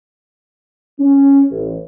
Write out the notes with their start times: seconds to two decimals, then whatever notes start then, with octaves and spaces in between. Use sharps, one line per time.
0.99 C#4
1.50 A1